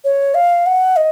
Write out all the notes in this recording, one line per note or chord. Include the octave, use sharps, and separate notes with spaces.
C#5
F5
F#5
D#5